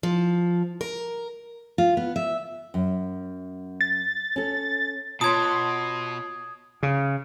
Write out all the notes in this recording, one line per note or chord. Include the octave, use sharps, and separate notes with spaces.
F3
A#4
F4
B3
E5
F#2
A6
C#4 A4
B2 F4 C#5 A5 C6 D#6 G#6
C#3